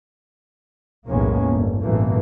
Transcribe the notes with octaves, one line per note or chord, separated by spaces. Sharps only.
B1 E2 A2 G#3 A#3 C#4
G1
A1 G2 B2 E3 A3 A#3